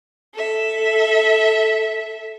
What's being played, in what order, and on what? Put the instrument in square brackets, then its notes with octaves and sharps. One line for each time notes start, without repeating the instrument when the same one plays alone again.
[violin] A4 E5